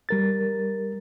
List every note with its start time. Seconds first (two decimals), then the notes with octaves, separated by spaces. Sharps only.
0.09 G3 A#4 A6